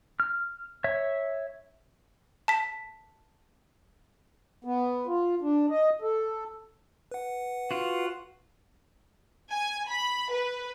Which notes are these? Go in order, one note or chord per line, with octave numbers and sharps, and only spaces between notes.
F6
C#5 E5
A5 B6
B3
F4
D4
D#5
A4
B4 F#5
F4 F#4
G#5
B5
B4